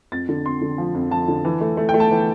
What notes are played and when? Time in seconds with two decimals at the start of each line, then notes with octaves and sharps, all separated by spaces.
0.12 F2 A6
0.29 D3
0.45 F2 C6
0.61 D3
0.78 F3
0.95 F2
1.11 F3 A5
1.28 D3
1.45 E3
1.61 A3
1.77 A3
1.89 G5
1.94 A3
2.00 A5
2.11 E3